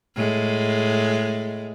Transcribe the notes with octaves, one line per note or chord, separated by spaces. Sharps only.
A2 G#3